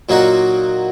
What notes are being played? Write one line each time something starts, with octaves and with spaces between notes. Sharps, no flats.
A#2 F#3 A#3 D#4 F#4